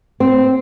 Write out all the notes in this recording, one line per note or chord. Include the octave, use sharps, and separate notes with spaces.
C4